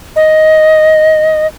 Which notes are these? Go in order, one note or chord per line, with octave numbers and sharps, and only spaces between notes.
D#5